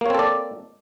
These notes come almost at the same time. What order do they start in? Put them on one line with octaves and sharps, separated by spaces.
A#3 C#5 C4 A4 D5